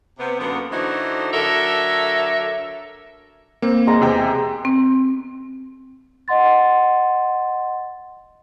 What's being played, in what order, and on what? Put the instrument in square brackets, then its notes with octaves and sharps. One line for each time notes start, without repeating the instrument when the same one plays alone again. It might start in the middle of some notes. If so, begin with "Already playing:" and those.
[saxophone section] C3 B3
F#2 D3 A#3 B3
D3 E3 A3 D#4 F#4 C5
D3 F#3 A4 A#4 E5
[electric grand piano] A#3 C4
[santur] G#3 A#5
[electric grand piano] E2 C3 G5
[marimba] C4
[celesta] D#5 F#5 C6 A6